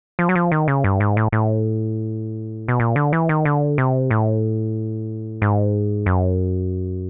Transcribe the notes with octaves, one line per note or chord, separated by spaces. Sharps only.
F3
F#3
F3
D#3
C#3
G2
G#2
A2
A2
B2
A#2
D3
E3
D#3
D3
C3
A2
G#2
F#2